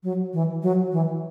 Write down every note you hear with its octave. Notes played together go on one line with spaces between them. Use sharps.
F#3
E3
F#3
E3